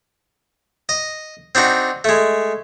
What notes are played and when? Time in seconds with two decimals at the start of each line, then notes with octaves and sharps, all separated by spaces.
0.89 D#5
1.55 C4 D4 D#4 F#4
2.04 G#3 A3